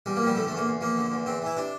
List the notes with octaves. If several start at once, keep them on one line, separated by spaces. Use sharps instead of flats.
E2 G3
A#3
F3 G3
D3 A3
E2 A3
A#3
E2
F3 A#3
D3
E2
E2 C4
E3 E4
C3 D4